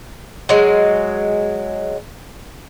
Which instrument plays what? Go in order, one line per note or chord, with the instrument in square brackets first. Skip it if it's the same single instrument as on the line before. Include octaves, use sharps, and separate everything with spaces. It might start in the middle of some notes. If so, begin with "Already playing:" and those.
[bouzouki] F#3 G#3